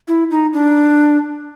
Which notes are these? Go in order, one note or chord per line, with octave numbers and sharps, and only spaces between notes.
E4
D#4
D4